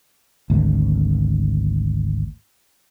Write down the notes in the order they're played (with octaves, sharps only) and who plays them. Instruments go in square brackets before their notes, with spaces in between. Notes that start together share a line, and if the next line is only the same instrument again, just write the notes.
[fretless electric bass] G#1 D2